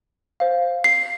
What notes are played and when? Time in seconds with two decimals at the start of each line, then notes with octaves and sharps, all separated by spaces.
0.40 C5 F5
0.84 C7